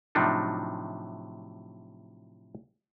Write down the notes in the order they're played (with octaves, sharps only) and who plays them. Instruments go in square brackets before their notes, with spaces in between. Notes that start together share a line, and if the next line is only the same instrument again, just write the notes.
[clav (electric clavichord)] A2 C3 F3 F#3 D4 D#4